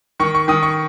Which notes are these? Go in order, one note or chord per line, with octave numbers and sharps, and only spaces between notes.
D#3 C#6
C#6
D#3 D#6
C#6